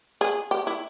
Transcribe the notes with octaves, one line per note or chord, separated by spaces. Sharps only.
G#4
G4
E4